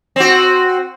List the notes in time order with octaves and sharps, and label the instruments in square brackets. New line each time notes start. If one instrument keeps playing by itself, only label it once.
[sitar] C4 F#4